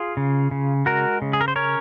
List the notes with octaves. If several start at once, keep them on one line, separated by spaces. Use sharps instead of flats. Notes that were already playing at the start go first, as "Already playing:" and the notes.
Already playing: F4 G#4
C#3
C#3
G#3 F#4 A#4
C#3
G#4
A#4
C5
C#4 A#4 C#5